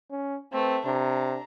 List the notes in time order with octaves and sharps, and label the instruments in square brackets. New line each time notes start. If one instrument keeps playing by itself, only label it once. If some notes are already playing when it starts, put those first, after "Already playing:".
[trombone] C#4
[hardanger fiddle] A3 B4 [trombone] C4
[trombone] C3 [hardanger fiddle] D4 A#5